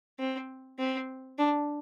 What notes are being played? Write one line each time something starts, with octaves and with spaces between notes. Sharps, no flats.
C4
C4
D4